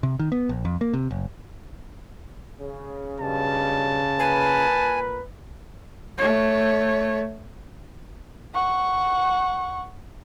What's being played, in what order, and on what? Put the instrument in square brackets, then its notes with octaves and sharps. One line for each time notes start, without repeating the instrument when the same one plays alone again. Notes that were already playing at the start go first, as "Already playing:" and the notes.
[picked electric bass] C3
D#3
B3
A#1
F2
A#3
C3
F#1
[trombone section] C#3
[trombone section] B1 G2 [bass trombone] C#3 [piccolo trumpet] A5
[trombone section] A#2 A#4 B4 [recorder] G#5
[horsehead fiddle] A3 C#5
[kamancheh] F#5 C#6